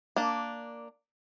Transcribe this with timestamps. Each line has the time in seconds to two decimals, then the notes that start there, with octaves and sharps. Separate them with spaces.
0.16 A#3 D4